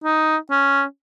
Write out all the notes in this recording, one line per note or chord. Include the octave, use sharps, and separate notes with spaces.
D#4
C#4